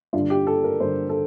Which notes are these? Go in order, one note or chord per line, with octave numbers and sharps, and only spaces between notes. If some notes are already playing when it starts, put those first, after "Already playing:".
G2 D3 F4
G4
A4
A#4
G2 D3 C5
A4